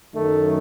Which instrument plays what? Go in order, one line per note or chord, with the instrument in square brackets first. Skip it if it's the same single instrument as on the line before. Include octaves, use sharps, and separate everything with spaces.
[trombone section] F#2 D#3 F#3 A3